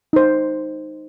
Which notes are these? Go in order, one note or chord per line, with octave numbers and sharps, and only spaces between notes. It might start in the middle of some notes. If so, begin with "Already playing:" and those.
D#4 C5